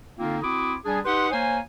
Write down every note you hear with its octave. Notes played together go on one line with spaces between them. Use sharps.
D3 A#3 C4 D#4 F4
C4 E4 F#4 D6 D#6
G3 D4 G#4
D#4 G4 B4 F#5 C6
A#3 C5 C#5 G#5